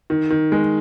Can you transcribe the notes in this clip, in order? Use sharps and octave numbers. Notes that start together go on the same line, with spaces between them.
D#3
D#3
G#3